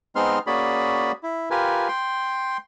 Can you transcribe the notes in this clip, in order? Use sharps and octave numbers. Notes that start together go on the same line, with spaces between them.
G#3 B3 C4 D#4 C6 F6
A#3 C#4 F#4 G#4 D5 B5
E4
F4 G4 A#4 B4 G#5
G5 C6